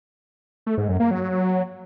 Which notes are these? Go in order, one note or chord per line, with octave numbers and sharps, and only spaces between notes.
A3
G#2
F#2
A#3
F#3